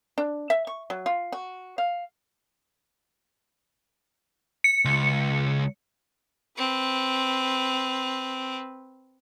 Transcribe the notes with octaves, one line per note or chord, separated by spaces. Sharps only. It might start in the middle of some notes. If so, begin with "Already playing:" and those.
D4
E5
C#6
F#3
F4
F#4
F5
C#7
C#2
C4 B4